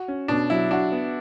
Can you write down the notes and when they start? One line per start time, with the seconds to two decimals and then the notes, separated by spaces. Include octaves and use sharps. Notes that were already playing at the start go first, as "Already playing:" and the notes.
Already playing: F#4
0.08 C#4
0.28 B2 D4
0.50 F#3 E4
0.71 D4 F#4
0.92 B3